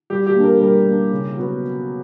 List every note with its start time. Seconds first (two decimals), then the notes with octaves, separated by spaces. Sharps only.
0.10 G3 G4
0.27 G4
0.35 A#3 D4
0.44 A#4
0.60 G3 A#4
0.86 A#3 D4
1.11 C#3
1.36 F#3 B3 F#4 B4